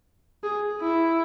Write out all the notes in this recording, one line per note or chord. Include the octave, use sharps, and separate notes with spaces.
G#4
E4